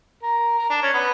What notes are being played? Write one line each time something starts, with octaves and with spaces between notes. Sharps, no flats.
A#4
A#4
D4
C#4
B3